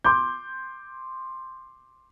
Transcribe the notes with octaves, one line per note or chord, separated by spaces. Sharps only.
C6 D6 G6